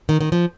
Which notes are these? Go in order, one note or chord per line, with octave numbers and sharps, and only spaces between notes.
D#3
D#3
F3